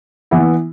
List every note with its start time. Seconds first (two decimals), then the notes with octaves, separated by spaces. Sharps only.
0.31 E3 B3 E4